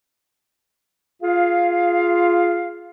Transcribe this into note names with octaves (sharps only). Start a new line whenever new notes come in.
F4 G#4 F5